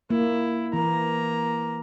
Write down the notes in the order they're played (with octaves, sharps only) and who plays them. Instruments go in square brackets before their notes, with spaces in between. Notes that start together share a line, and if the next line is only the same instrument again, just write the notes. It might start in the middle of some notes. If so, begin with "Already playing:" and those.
[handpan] A#3 [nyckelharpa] E4
[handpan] E3 [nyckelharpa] A#3 A#5